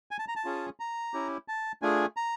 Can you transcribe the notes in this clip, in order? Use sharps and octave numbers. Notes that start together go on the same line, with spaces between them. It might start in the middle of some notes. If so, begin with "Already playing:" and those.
G#5
A5
A#5
A5
C#4 F4 G#4
A#5
C#4 E4 G4
A5
A3 D4 F4 G#4 G#5
A#5